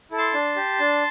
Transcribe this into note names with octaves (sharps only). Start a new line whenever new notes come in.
E4 A4
A5 C6
D4
G4
D4